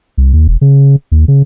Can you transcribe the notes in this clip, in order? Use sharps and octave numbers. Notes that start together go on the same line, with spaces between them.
C2
D#2
E1
C#3
D#2
C#3